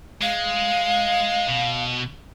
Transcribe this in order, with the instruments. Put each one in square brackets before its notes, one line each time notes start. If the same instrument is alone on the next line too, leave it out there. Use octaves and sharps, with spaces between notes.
[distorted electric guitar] G#3 [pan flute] F5
[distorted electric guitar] B2